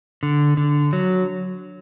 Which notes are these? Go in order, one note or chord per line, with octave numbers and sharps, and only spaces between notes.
D3
D3
F#3